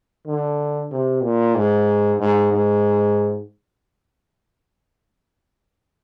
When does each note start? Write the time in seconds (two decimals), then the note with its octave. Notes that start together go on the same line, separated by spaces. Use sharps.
0.27 D3
0.91 C3
1.23 A#2
1.56 G#2
2.20 G#2
2.52 G#2